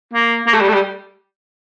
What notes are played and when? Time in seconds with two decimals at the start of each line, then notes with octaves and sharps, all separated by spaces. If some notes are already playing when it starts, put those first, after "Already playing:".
0.14 A#3
0.46 A#3
0.53 A3
0.60 G3
0.68 A3
0.73 G3